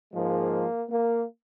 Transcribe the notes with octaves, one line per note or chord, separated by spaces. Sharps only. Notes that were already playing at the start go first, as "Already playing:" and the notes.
G#2 F3 G#3 A#3
A#3